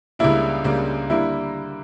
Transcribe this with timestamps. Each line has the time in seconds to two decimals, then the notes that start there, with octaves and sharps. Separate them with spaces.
0.19 C#2 C#3 G3 A#3 D4 E4
0.64 C#2 C#3 G3 A#3 D4
1.10 D3 G3 A#3 E4